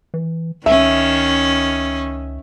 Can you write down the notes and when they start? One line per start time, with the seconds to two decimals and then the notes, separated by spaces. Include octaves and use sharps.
0.14 E3
0.66 C#2 D#3 C#4 E5